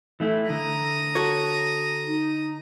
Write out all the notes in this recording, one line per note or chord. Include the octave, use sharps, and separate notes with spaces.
E3 A3 E4
D3 A#5 D#6
F#4 A4 C#5
D#4